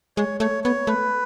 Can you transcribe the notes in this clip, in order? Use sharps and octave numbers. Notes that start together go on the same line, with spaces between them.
G#3 C#5
A3 C#5
B3 C#5
A3 B4